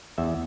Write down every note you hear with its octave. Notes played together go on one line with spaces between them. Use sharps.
E2 E5